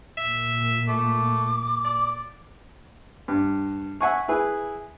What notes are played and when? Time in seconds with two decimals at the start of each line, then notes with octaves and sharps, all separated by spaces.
0.17 A#2 E5
0.87 A3 D6
1.84 D5
3.28 G2
4.01 E5 F#5 G#5 C#6
4.28 E4 G#4 B4